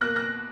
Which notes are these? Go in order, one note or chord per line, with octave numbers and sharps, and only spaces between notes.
B2 A#3 F#6 A#6
F#6 A#6